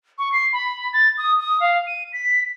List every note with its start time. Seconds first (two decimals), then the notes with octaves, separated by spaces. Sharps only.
0.18 C#6
0.32 C7
0.53 B5
0.93 A6
1.18 D#6
1.40 D#6
1.60 F5
1.87 D#7
2.13 B6